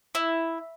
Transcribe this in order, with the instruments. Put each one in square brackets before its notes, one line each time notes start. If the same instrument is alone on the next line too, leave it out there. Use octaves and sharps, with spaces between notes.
[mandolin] E4